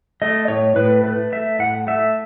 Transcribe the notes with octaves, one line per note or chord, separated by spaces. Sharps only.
A3 D#5
A2 C#5
A2 B4
A3 B4
A3 E5
A2 F#5
A3 E5